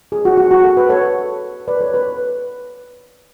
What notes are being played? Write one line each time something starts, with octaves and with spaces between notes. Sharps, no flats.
G#4
F#4
F#4
F#4
A4
B4
A4 C#5
B4 D5
A4 C#5
B4